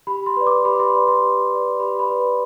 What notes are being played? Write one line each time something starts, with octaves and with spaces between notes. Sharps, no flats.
G4 B5
C6
B4 D5
D6
G4 B5
C6
B4 D5 B5
C6
G4
B4 D5
G4 B5
B5
B4 D5